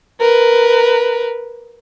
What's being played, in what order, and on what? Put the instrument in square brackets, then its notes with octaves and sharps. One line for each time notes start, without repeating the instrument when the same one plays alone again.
[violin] A#4 B4